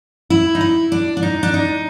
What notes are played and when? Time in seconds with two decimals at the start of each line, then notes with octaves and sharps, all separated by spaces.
0.30 E4
0.55 D#4
0.61 E4
0.92 D4
1.17 D4
1.23 D#4
1.43 D4
1.54 D#4